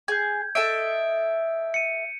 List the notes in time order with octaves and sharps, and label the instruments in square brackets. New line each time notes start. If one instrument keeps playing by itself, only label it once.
[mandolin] G#4 [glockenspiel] G6 G#6
[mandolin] A4 D#5 E5 [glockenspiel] D7
[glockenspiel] C#7 D#7